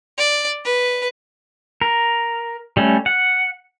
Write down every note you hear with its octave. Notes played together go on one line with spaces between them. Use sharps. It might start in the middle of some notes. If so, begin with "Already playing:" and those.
D5
B4
A#4
G3 A3 C#4
F#5